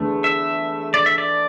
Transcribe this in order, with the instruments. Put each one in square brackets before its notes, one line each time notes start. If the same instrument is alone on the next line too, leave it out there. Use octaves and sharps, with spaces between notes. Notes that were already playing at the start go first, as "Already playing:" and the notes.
Already playing: [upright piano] E2 D3 A3
[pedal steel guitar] E5
D5
E5
D5